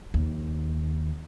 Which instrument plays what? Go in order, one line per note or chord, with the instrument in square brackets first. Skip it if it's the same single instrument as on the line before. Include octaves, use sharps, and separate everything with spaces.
[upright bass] D#2